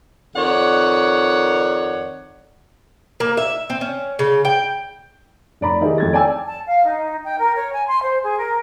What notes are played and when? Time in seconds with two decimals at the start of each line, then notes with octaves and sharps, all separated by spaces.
0.36 F2 D#3 C#5 D5 F#5
3.20 A#3
3.37 E5
3.70 C4
3.81 C#4
4.19 C#3
4.45 G5
5.61 F1 D5 A#5 B5
5.81 D#3 D#4 E4 G4 G#4 A#4
5.98 F2 G#6 A6
6.13 D5 G5 G#5 E6
6.46 A5
6.68 F5
6.85 D#4
7.23 G5
7.39 A#4
7.56 C#5
7.73 G#5
7.87 C6
8.03 C5
8.23 G#4
8.38 A#4